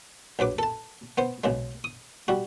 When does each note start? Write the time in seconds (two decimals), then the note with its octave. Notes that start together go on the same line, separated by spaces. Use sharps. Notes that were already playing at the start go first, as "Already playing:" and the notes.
0.39 A#1 F#3 B4 D6
0.59 A4 A5
1.18 B3 C5
1.44 B1 C#3 G#3
1.84 D#6
2.28 G3 F#4